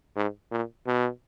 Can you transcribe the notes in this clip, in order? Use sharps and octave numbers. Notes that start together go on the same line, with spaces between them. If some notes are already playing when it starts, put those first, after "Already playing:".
G#2
A#2
B2